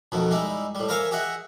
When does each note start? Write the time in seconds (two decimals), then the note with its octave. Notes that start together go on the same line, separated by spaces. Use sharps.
0.12 F2 B2 D#3 A3
0.31 G3 G#3 D#4 E4
0.75 A2 G3
0.89 A#4 C5 C#5 E5 F5 G#5
1.11 G4 G#4 D#5 E5 F#5